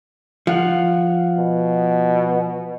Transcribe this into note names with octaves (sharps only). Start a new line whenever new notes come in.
F3 F5 F#5
B2